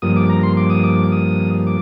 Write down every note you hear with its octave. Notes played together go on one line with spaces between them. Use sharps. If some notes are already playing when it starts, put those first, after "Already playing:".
G2 F3 A#3 D#6
D6
A#5
C6
D6
D#6
D6
D#6
D6